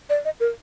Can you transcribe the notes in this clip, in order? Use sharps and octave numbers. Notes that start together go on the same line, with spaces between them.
D5
D#5
A#4